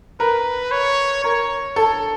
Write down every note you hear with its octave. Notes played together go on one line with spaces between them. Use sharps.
A#4 B4
C#5
A#4 C#5
A4